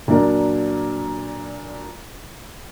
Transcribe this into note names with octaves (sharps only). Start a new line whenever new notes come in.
A#2 F#3 D4 A#4